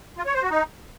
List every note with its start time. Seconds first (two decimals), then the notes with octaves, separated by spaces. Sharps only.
0.18 F4
0.26 C#5
0.34 C5
0.42 F#4
0.50 D#4